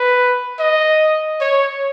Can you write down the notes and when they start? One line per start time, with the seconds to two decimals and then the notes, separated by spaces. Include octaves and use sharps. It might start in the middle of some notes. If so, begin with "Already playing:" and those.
Already playing: B4
0.60 D#5
1.41 C#5